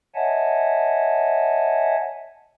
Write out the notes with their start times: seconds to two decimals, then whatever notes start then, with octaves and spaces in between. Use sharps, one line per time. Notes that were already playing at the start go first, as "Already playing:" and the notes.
0.15 C#5 D#5 E5 F#5 G#5 A5